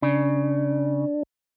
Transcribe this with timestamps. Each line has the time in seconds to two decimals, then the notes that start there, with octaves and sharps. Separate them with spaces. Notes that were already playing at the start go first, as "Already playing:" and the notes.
0.02 C#3 D4